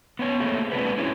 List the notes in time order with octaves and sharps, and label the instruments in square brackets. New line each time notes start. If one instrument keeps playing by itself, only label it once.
[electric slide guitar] B3 C#4 C#5
A3 A#3 C4 G#4
G#3 C4 D4 F4 B4
C#4 E4 G#4 C#5